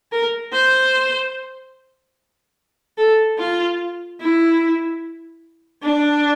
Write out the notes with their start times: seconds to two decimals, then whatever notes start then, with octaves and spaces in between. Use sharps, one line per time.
0.12 A#4
0.53 C5
2.98 A4
3.39 F4
4.20 E4
5.83 D4